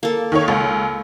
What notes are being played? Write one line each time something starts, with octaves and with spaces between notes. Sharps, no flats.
A#3 A4
D#3 C#5
C#2